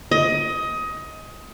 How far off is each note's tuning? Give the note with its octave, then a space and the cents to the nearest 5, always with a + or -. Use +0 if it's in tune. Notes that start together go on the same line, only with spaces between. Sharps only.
D#5 +20